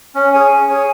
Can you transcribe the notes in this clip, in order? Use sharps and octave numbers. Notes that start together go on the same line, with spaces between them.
C#4
G#4 C#5 G#5
C#4
G#4 C#5 G#5